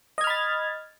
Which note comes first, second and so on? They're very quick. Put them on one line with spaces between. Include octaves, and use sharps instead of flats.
D#5 G#6 F6 B5 A6